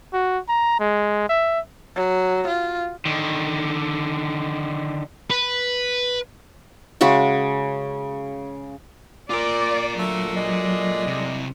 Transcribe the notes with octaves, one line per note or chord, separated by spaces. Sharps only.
F#4
A#5
G#3
E5
F#3
F4
D3 D#3
B4
C#3 G#3 F#4 E5
A#2 F4 A#4 D5 D6
D3 F#3 A3
G#3 A3 D4 D#5
C2 C3